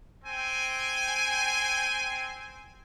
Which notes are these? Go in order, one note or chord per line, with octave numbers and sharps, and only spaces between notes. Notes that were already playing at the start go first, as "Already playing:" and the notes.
C4 G5 G#5